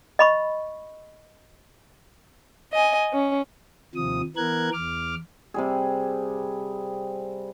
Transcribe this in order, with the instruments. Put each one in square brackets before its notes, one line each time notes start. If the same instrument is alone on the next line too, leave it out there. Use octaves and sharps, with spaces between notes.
[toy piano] D#5 B5 C#6
[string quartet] D#5 G#5
C#4
[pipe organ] D#2 C3 F3 D#6
E3 B3 A#4 F#6 G#6
E2 D6 F6
[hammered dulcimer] C3 G3 G#4